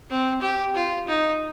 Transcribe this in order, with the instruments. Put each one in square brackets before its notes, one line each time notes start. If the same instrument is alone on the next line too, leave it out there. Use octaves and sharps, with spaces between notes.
[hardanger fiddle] C4
G4
F4
D#4